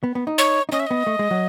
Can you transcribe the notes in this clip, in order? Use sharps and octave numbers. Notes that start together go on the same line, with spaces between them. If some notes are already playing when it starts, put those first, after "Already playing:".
B3
B3
D#4
C#5
D#4
C#4 D#5
E5
B3 D#5
A3
G#3
F#3